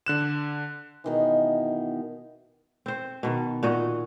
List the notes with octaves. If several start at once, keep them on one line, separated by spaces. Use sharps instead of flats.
D3 F#6 E7
B2 D#3 E3
C4 C5
B2 D#3
A#2 F#4 D#5